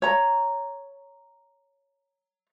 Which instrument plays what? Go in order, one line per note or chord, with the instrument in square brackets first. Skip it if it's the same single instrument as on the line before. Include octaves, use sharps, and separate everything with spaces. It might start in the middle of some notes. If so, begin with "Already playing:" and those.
[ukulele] C#5 A#5